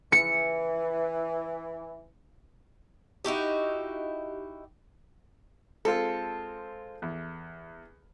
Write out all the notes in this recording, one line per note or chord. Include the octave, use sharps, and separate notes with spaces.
E3 C#7
D#4 E4 F#4 G4
G#3 C4 F4 A4
E2